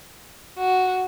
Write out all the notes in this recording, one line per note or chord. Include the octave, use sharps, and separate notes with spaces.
F#4